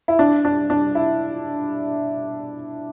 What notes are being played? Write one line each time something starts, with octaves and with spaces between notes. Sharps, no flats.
E4
D4
D4
D4
E4